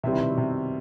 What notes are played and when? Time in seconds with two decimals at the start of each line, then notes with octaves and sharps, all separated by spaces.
0.04 C3 G3 C4 E4 B4 E5
0.13 D#3
0.21 C3
0.30 B2
0.38 C3